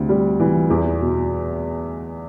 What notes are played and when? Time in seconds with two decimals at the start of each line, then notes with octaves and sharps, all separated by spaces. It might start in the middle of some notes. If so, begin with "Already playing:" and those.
Already playing: D2 C3
0.09 G3
0.40 E3
0.70 E2
0.99 B2